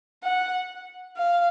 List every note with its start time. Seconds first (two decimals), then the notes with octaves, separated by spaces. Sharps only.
0.24 F#5
1.16 F5